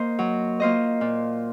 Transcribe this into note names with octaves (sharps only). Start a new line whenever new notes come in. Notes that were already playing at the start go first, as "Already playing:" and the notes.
Already playing: A#3 C5 D#5
F#3
A#3 F4 C5 D#5
A#2